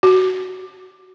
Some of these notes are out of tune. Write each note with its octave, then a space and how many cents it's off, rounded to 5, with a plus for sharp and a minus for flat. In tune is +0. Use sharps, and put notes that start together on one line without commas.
F#4 +10